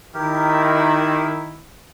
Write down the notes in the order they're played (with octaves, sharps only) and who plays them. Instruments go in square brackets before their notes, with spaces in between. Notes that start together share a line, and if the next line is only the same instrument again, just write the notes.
[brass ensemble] D#3 E4 [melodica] G4 A#4